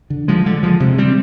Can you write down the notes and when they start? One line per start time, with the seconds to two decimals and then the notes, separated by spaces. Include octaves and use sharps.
0.10 D3
0.28 F3 G#3
0.46 D3
0.63 F3 G#3
0.80 C3
0.98 G3 C4